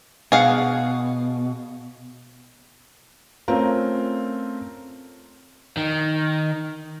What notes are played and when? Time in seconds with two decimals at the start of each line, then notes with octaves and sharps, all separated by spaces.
0.32 B2 G#4 F5 F#5
3.48 A3 C4 C#4 F4 A#4
5.77 D#3